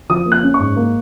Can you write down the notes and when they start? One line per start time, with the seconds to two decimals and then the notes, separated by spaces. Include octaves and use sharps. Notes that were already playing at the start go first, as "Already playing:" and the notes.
0.09 F3 D#6
0.26 A#3
0.32 F#6
0.43 C#4
0.54 C#6
0.59 G#2
0.76 A#3